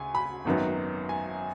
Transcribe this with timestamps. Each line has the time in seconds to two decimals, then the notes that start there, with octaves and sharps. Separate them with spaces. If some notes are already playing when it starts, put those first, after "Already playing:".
Already playing: D2 C#3 G#5
0.15 B5
0.45 G#1 F#2 D#3 F#3 B3
1.09 G#5